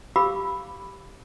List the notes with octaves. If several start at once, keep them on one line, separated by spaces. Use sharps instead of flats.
G4 F5 B5 D6 E6